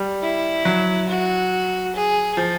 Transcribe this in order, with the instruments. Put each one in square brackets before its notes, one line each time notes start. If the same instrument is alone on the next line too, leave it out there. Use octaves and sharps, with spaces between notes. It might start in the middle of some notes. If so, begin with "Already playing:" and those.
Already playing: [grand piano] G3
[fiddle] E4
[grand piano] F#3
[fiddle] F#4
G#4
[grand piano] F3